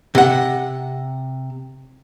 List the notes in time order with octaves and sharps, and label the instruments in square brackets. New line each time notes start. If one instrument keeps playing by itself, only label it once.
[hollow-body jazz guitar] C3 F#5